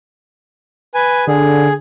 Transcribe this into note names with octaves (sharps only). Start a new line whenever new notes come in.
B4 G#5
D3 G#4